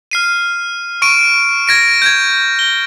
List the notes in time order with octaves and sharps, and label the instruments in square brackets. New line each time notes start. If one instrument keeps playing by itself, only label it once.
[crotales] F6 C7 D#7
C#6 D7 D#7
G#6 A#6 D7
G6 G#6
G7